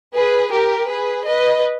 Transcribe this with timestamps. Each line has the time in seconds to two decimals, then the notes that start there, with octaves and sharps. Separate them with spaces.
0.14 G#4 B4
0.52 G4 A#4
0.89 G#4 B4
1.27 B4 D#5